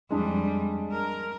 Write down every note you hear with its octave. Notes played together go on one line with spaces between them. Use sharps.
F2 G3 G#3 D4
A#4